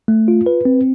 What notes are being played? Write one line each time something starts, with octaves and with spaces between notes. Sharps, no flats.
A3
F4
B4
C4